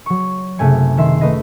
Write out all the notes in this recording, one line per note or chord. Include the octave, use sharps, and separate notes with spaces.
F#3 C#6
F#1 C3 A3 G#5 C#7
D#3 E5 C6 C7
A3 B4 D#5 A#6